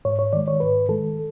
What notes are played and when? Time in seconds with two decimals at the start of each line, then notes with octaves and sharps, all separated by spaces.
0.05 G#2 C#5
0.19 C#5
0.33 D#3 G#3 D5
0.48 C#5
0.60 G#2 B4
0.88 D#3 G#3 A4